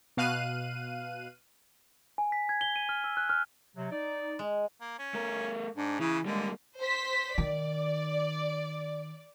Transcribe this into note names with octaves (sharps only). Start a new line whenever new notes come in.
B2 F5 F#6 D#7
G#5
B6
G#6
G7
D#7
F6
E6
F#6
F6
C3 F#3
D#4 D5
G#3
A#3
C#4
A3 A#4
G#2 D4
C#3 E3 E4
D3 G3 G#3 A#3
C5 B6
D#3 D5